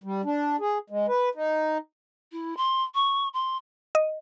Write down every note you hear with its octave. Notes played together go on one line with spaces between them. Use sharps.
G3
D4
G#4
G#3
B4
D#4
E4
C6
C#6
C6
D#5